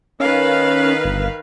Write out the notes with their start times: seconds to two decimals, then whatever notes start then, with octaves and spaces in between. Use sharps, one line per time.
0.20 D#3 C#4 B4 F5
1.05 G1